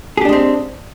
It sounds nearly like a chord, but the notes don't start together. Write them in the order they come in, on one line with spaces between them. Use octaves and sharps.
G#4 G4 D4 G#3 C4